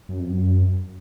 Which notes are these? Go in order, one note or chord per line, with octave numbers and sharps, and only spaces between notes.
F#2
F2
F#2